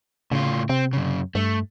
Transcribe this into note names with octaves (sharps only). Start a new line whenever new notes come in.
A2 C#3 F4
C3 C4
F#2 C#3
G2 A3